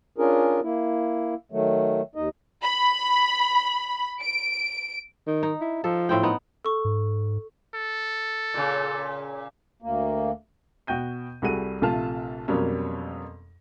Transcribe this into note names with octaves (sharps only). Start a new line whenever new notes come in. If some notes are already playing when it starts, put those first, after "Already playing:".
C#4 D4 F4 G#4 A#4
A#3 E4
D#3 F#3 A3
D#2 D#4 D#5
B5
D7
D#3
D#4
E4
F3 A4
A2 C4 G5
B3 D#4
A4 C#6
G#2
A4
A#2 C#3
D2 A#3
B2 F#4 G5 G6 D#7
C2 G3 F#4 G#4 A4 D#7
A#1 C3 A3 F4 A5 F6
F2 B2 F#3 G3 A#3 C#4